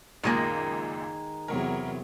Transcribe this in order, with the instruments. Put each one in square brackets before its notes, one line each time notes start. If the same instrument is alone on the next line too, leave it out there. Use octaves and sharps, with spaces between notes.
[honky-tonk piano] C#2 F#2 A#2 [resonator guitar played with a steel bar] D#3 G#3 A#3
[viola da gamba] E2 C3 F#3 [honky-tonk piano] A#4